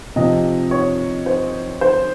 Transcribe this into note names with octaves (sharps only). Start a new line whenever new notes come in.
C3 F3 D#5
C#5
C5
C5